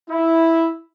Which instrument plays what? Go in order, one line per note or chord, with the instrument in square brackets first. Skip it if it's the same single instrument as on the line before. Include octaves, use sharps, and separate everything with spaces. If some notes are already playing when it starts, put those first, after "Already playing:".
[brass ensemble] E4